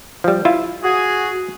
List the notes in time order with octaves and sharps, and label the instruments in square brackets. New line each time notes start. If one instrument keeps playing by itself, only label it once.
[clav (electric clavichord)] F3 G3
E4 F4 E5
[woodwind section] F#4 G#4